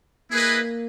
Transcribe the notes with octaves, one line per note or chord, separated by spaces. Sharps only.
A#3 E4 G#4 B4 D#5